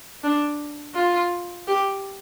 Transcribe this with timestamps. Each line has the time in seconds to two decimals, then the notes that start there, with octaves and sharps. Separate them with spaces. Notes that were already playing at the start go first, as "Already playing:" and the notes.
0.24 D4
0.95 F4
1.68 G4